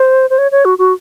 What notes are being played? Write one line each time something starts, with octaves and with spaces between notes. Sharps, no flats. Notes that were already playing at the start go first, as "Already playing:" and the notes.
Already playing: C5
C5
C#5
C#5
F#4
F#4